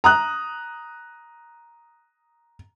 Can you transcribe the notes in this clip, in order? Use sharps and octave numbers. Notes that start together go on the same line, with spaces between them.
A#5 D#6 F#6